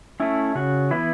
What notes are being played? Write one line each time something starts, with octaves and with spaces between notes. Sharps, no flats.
A3 C#4 E4
C#3 F#4
E3 B3 E4